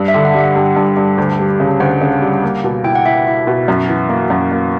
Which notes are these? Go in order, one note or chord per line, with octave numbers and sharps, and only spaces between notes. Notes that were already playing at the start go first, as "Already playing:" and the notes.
Already playing: G2
E5
D3
F#5
G3
F#5
G2 G5
G2
G2
D2
G3
C#3
D2 F#5
C#3
G3
A#3
B2
E4 G5
F#5
E4 E5
E4
B2
F#2
E3
A#3
F#2
A#3